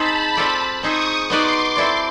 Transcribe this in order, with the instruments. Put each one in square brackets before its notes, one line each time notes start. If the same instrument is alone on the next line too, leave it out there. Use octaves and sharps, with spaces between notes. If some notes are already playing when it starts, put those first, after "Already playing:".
Already playing: [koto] C4 D#4 G#4 C5 [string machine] A5 B5
[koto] C4 F4 A4 D5
[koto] C4 D#4 G#4 C5 [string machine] C#6 D#6
[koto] B3 D#4 F#4 B4 D5 [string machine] C6 D6
[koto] C4 E4 A4 D5